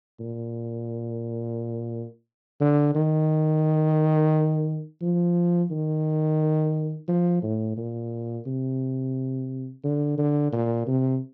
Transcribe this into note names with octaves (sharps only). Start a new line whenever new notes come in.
A#2
D3
D#3
F3
D#3
F3
A2
A#2
C3
D3
D3
A#2
C3